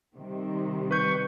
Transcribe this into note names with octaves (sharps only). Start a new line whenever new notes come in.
C3 D#3 G3
B4 C#6 G6